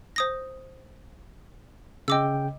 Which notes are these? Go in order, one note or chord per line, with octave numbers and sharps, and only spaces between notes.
C5 D#6 A#6
C#3 D#5 G5 D6 E6